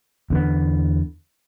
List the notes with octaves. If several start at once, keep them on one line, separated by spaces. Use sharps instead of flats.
E2 D3 B3